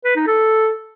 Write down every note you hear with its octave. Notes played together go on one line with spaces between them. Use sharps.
B4
D#4
A4